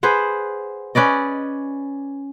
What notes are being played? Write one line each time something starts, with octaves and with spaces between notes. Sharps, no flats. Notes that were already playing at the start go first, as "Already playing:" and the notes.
G#4 B4 C5 F#5
C#4 B4 D5 D#5